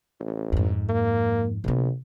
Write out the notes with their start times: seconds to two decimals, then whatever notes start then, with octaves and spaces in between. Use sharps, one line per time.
0.20 A1
0.52 F2 G#2
0.89 A#3
1.64 A#1 C3 B3